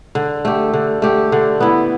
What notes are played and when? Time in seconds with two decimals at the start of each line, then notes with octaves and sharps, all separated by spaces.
0.15 D3
0.45 A3 G4
0.74 D3
1.02 A3 G4
1.32 D3
1.60 B3 E4